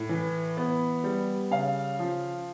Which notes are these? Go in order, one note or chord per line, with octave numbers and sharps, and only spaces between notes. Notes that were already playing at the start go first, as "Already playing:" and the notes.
Already playing: A2
E3
B3
G3
C#3 F5
F3